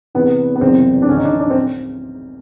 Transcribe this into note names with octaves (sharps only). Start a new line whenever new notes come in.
E2 C3 E3 B3
B3
F#1 E2 C3 E3 C4
D4
D2 C#3 E3 C#4
D#4
D4
D4
C4